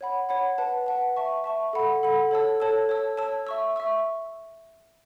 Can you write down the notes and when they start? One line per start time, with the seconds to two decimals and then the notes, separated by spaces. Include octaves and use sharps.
0.01 C#5 F#5 B5
0.29 C#5 F#5 B5
0.58 B4 F#5 A5
0.86 B4 F#5 A5
1.16 E5 A5 C#6
1.44 E5 A5 C#6
1.73 A4 F#5 B5
2.03 A4 F#5 B5
2.31 A4 C#5 A5 E6
2.60 A4 C#5 A5 E6
2.89 C#5 A5 E6
3.17 C#5 A5 E6
3.47 E5 C#6 E6
3.76 E5 C#6 E6